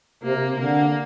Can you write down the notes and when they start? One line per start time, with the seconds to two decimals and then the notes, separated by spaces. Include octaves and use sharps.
0.23 C3 A#3
0.43 C3
0.60 D3 A#3